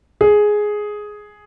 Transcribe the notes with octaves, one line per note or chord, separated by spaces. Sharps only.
G#4